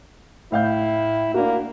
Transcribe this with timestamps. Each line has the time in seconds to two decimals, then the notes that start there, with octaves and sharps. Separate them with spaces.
0.52 A2 E4 F5 G6
1.34 A#3 D4 F#4